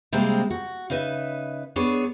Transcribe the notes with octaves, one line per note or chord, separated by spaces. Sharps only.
C3 G3 G#3 A#3 C4
F#4
C#3 D#4 B4 D#5 E5
B3 D4 G#4 C#5